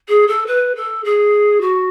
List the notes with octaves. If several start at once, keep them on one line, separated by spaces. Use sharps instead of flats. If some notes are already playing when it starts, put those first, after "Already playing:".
G#4
A4
B4
A4
G#4
F#4